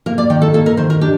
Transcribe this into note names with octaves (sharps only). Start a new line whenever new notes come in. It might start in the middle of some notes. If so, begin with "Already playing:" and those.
A#3 A#4
D5
D#3 G5
A4
A#3 A4
A#4
D#3 C5
A#4
D4 G4